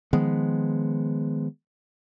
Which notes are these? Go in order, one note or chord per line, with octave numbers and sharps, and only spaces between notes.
D#3 F3 G#3 B3